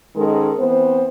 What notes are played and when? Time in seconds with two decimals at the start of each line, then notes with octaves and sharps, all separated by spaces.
0.15 G#2 D#3 G#3 C#4 A4 A#4
0.58 E3 B3 C4 C5